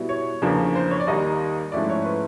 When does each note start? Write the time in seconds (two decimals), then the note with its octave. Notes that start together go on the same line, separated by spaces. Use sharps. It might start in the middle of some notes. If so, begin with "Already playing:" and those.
Already playing: B2 G3 B3 E4
0.09 C#5
0.42 E2 C#3 F3 A#3 D4
0.75 C5
0.91 C#5
1.00 D5
1.07 D#2 D#3 G3 A#3 D#4 D#5
1.72 G#2 F3 A3 C#4 E4 D5
1.89 C#5
2.05 B4